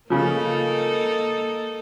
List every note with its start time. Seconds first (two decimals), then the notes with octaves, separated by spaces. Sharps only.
0.10 C#3 F3 A#3 D#4 A4